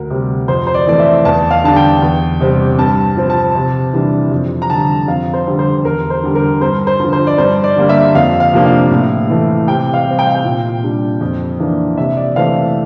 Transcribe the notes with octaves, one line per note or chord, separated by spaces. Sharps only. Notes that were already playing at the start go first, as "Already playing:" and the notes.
Already playing: D2 A#4
C3 G3
F2 C5
C5
D5
E3 A3 C4 D5
E5
E2 A5
F5
D3 G3 D4 A5
G5
E2
C3 G3 C4
G2 A5
F3 C4
A5
C3
E3 G3 D4
F2
A#5
D3 G3 A5
F2 F5
C5
D3 G3 C4
C5
E2 A#4
C5
D3 G3
A#4
G2 C5
C5
D3 F3
C5
D5
G2 C5
D5
D3 G3 A#3
E5
F2 F5
F5
C3 F3 A#3 D4
F5
A2
E3 A3
C3 G5
F5
G3 C4
G5
F5
G5
A#2
G3 D4
F2
E3 A#3 D4
C3 E5
D5
E3 A3 C4 F5